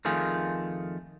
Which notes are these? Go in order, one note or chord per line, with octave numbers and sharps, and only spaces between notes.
F2 D#3 A3 F4 G#4